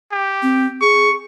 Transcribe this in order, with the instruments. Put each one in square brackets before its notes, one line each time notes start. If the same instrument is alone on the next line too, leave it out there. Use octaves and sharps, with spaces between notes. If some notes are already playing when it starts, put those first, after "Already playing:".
[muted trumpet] G4
[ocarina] C4
[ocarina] G#4 [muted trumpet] C#6